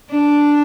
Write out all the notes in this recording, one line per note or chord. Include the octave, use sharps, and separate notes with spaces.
D4